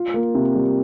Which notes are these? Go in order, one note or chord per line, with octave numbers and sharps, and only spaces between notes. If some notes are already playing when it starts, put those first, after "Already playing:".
Already playing: F4
A#3
C3
G3